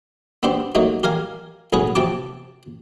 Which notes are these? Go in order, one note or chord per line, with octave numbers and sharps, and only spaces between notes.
B3 C4 D4 G4 C5
F#3 A3 A#3 D#4 F#4
G4 A#4 F5 G#5
B1 A2 B3 C#4 G#4 B4
C3 F3 G4 G5 A5 D6